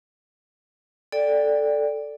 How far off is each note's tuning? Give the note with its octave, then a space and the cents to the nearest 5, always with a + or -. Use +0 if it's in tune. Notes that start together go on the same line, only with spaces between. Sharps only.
A4 +0 D5 +0 G5 +15